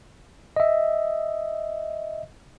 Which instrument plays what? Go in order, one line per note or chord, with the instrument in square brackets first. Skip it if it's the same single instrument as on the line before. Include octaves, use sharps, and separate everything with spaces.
[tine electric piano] D#5 E5